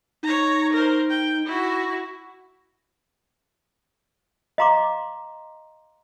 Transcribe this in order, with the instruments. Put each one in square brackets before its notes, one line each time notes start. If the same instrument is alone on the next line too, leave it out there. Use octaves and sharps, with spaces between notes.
[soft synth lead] D#4 [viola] C#5 A#5
[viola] A#4 C5
G5
E4 F#4
[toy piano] D#5 F5 A#5 C6 D6